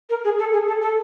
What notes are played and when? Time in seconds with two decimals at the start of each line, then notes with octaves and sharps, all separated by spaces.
0.10 A#4
0.24 G#4
0.39 A4
0.53 G#4
0.67 A4
0.82 A4